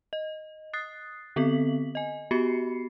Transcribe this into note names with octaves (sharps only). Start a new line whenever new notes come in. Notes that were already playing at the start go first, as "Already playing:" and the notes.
D#5
D#6 F#6 A6 C7
D3 B3 C4 A4 B6 F#7
D#5 G#5
B3 F#4 G4 B5 C7 C#7